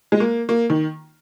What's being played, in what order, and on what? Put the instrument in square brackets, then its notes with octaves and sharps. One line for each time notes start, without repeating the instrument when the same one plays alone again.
[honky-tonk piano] G#3
A#3
A#3
D#3